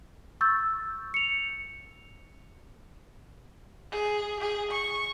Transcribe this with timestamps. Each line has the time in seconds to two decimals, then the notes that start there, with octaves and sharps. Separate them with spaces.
0.41 C#6 E6 G6 A6
1.14 C#7 F7
3.91 G#4
4.40 G#4
4.71 C#6